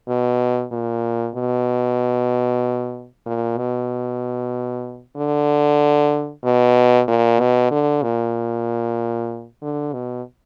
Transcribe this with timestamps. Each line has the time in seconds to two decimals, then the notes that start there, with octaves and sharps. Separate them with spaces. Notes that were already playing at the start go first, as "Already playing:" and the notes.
0.08 B2
0.72 A#2
1.35 B2
3.26 A#2
3.58 B2
5.17 D3
6.44 B2
7.08 A#2
7.40 B2
7.71 D3
8.03 A#2
9.62 D3
9.94 B2